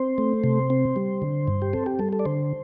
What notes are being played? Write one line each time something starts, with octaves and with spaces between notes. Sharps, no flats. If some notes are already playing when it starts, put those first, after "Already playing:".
Already playing: C4 C5
A3
C3
C4
G3
D3
G2
G4
C4 A4
G4
G3 A4
A4
D5
D3 C5